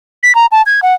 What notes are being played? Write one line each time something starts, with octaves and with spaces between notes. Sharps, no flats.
B6
A#5
A5
G#6
F#5